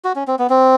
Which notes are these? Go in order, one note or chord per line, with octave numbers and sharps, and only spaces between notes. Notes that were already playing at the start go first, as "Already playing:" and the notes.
F#4
C#4
C4
B3
C4